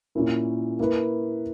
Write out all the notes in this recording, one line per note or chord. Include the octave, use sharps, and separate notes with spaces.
A#2 A#3 C#4 E4 A#4
A#3 E4 B4